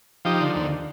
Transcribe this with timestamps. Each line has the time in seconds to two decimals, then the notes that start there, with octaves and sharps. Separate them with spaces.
0.25 F3 D#4 G4
0.40 D3
0.55 D#2